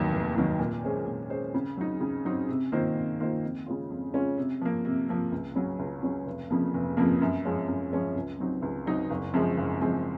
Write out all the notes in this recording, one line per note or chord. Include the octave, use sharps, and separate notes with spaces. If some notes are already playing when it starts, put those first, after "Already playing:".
Already playing: F1 D#2 D#3 F#3 A#3
F1
D#2 D#3 F#3 A#3
A#2
G#3 C#4 G#4 C5
A#2
G#3 C#4 G#4 C5
C#3
F#3 C4 D#4
C#3
F#3 C4 D#4
C3
D#3 A#3 F4 C5
C3
D#3 A#3 F4 C5
F2
C#3 G#3 C#4 F4
F2
C#3 G#3 C#4 F4
C3
F3 A#3
C3
F3 A#3
C#2
C#3 F#3 C#4
C#2
C#3 F#3 C#4
F1
F2 C#3 F3 A#3
F1
F2 C#3 F3 A#3
F#2
F3 G#3 C#4 F4
F#2
F3 G#3 C#4 F4
C#2
C3 F#3 C4 D#4
C#2
C3 F#3 C4 D#4
F#1
F#2 F3 G#3 C4
F#1
F#2 F3 G#3 C4